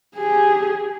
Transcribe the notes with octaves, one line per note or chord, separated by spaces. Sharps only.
G4 G#4